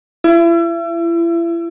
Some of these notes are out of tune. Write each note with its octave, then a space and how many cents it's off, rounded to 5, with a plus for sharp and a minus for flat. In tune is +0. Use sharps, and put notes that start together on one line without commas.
E4 +35